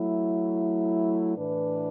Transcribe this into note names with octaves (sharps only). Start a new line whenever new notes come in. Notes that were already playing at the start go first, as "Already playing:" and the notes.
Already playing: F#3 A3 E4
A2 E3 D4 B4